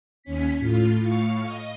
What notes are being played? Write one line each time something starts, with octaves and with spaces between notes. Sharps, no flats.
D#2 C#4 B6
A2 F4
A2 F5 C#6
D#5